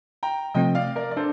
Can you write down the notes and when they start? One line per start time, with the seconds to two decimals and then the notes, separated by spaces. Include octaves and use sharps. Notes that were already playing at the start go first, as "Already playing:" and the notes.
0.23 G5 A#5
0.54 C3 F3 A3 C4 D#5 G5
0.75 D5 F5
0.96 A#4 D5
1.11 D5
1.16 D4 A4 C5